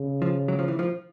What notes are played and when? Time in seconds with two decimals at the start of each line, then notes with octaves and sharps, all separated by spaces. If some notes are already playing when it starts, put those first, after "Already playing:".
Already playing: C#3
0.22 F3
0.48 F#3
0.59 F3
0.68 E3
0.79 F3